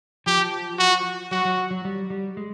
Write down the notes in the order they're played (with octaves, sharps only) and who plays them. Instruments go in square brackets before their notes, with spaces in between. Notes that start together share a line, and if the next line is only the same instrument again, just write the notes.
[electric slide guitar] F3 [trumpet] G4
[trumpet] F#4
[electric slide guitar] F#3 [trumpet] F#4
[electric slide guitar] F#3
F#3
G3
G3
G#3